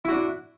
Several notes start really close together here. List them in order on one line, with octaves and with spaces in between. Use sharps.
E4 F#4 D4